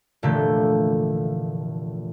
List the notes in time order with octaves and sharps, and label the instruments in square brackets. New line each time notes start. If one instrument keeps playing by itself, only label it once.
[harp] F1 A#2 D3 E3 A3 G6